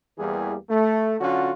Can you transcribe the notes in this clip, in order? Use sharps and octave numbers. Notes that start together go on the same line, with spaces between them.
E2 E3 G3 A#3 G4 G#4
A3
D3 F#3 C#4 F4 F#4